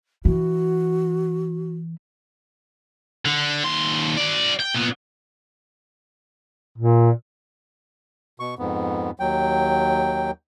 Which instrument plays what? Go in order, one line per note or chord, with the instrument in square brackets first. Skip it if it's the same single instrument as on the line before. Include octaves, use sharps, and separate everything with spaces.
[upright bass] E3 [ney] F#4
[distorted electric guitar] D3
D#2 C6
F#4 D5
G5
A#2 B3
[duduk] A#2
[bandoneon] B2 C#6
F2 G#2 B3
D#2 F#3 G5